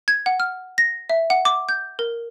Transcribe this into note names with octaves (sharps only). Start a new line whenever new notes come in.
G#6
F#5
F6
A#6
E5
F#5
D6
G6
A#4